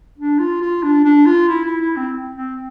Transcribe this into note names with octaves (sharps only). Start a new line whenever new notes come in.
D4
F4
F4
D4
D4
F4
E4
E4
E4
C4
C4